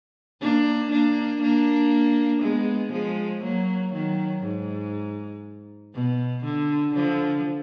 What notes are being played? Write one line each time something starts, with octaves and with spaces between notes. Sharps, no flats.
A#3 D4
A#3 D4
A#3 D4
G#3 B3
F3 G#3
F#3 A#3
D#3 F#3
G#2
B2
D3
D3 F3